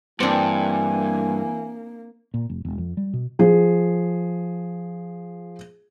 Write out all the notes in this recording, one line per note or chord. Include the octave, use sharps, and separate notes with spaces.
G2 E3 A#3 C4 D4 G#5
A#2
F1
E1
F2
G3
B2
F3 G#4